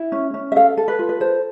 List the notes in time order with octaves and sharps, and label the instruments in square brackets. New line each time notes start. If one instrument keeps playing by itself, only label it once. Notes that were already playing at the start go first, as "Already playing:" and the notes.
Already playing: [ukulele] E4
C#4
C#4
E5
A4 F5
A4
B4
F4
B4
A4 C5